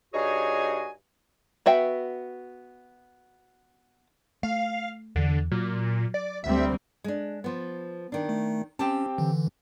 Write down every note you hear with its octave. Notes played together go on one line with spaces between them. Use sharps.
G2 D#4 F#4 G#4 C#5 G#5
B3 F#4 E5 G5
A3 F5
E2 D3
A#2 F#3
D5
D2 G3 C4 E5
G#3 D4
F3 B3
D#3 D4
A3
C4 C#4 G4 A5
D3 E3